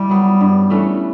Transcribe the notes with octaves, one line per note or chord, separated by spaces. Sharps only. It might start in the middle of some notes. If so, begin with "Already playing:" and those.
Already playing: G3 E4
F#3 B3
G2
E3 A3 C#4